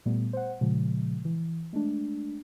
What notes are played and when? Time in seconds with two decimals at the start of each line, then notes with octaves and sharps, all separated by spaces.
0.06 A#2 G3 A3 B3
0.33 C5 F#5
0.61 A#2 C#3 F3 G#3
1.25 E3
1.73 G#3 A3 D4